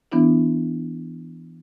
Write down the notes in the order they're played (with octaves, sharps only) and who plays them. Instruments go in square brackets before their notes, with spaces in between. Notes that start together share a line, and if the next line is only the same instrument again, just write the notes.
[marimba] E3 B3 D4 E4